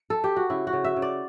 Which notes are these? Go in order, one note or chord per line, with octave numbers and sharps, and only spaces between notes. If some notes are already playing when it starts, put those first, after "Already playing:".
Already playing: B4
A4
G4
F#4
C#3 E4
F#4
C#3
E5
C#3
D5